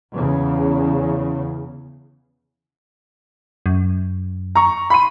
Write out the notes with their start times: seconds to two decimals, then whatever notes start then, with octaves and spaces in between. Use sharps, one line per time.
0.13 E2 C#3
3.66 F#2
4.55 A#5 C#6
4.90 B5 C6 D#7